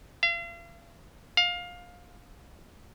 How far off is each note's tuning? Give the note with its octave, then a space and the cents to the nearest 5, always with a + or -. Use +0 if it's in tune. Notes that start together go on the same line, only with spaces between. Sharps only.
F5 -40
F5 +20